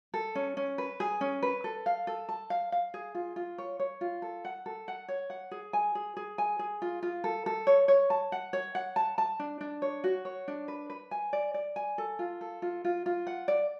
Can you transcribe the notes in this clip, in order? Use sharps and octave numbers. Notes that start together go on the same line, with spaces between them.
A4
C#4
C#4
B4
G#4
C#4
B4
A4
F5
A4
A5
F5
F5
G#4
F4
F4
C#5
C#5
F4
A4
F#5
A4
F#5
C#5
F#5
G#4
G#5
G#4
G#4
G#5
G#4
F4
F4
A4
A4
C#5
C#5
A5
F#5
C#5
F#5
A5
A5
D4
D4
C#5
F#4
C#5
D4
B4
B4
G#5
D5
D5
G#5
A4
F4
A4
F4
F4
F4
F#5
D5